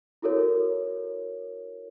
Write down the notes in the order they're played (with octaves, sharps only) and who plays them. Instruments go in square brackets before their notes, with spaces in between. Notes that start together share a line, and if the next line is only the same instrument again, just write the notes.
[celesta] E4 F#4 A4 A#4 C#5